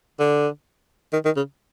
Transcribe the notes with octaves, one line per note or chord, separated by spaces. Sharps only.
D3
D#3
D#3
C#3